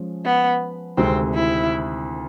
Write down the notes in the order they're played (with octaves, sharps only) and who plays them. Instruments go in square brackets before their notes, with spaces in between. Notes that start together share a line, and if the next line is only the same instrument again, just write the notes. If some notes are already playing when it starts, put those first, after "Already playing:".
Already playing: [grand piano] F3 G#3 C#4
[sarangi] B3
[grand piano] D2 C3 D#3 G#3 [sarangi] C4
[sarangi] E4